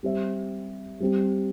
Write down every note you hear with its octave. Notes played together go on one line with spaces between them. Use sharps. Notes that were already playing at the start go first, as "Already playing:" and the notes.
G3 C4 G4 C5 E5
G3 C4 G4